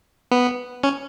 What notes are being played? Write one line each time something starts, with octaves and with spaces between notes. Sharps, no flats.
B3
C#4